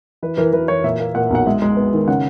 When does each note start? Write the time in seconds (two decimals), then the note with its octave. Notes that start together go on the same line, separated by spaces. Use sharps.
0.23 E3 B4
0.37 E3 A#4
0.53 E3 B4
0.68 E3 C#5
0.84 A#2 E5
1.00 A#3
1.15 A#2 F#5
1.31 B1 F#5
1.46 G#3 E5
1.62 G#3
1.77 B3
1.93 D#3
2.08 C#3 F#5